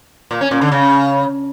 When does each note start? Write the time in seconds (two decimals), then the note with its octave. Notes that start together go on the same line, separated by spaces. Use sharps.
0.31 A#2
0.41 C#4
0.51 A#2
0.61 D3
0.72 C#3